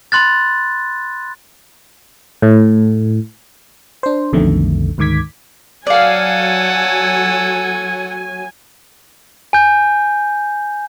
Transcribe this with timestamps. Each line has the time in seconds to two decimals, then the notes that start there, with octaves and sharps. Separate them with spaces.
0.12 B5 C6 F#6 A6
2.42 A2
4.03 D4 C5
4.33 B1 F2 B2 D3 D#3 A3
4.98 D2 G#2 D#3 D6 G#6 B6
5.87 F#3 A4 D5 F5 F#5 G#5
9.53 G#5 G6